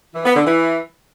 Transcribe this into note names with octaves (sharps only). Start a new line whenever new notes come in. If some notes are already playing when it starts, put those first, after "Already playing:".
E3
B3
D3
E3